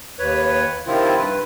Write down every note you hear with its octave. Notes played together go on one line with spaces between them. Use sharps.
D#2 B4 C#5
C3 D#3 F3 C4 E4 F4
G2 B4